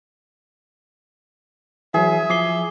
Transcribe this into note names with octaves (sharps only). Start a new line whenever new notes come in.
E3 F#3 G#4 E5
F3 D6 C7 G7